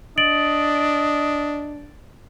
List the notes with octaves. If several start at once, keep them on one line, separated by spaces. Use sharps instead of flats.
D4 D#5 A6 D7 F#7